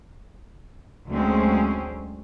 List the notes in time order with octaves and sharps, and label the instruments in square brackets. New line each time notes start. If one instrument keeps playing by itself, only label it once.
[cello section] D2 F#3 G#3 C4 C#4